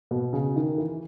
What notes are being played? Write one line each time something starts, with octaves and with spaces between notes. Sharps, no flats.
B2
C#3
D#3
E3